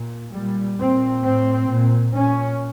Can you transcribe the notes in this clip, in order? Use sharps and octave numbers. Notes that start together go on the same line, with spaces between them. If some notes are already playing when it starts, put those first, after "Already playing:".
Already playing: A#2
A#2 G3
A#2 C4
A2 C4
A#2
A#2 C#4